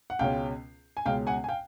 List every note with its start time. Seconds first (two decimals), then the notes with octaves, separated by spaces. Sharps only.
0.10 F#5
0.19 C#2 B2 G#3 C#4 F5 G5
0.97 G#5
1.06 C#2 B2 G#3 C#4 F5 G5
1.27 F#5 G#5
1.44 G#5
1.48 F5 G5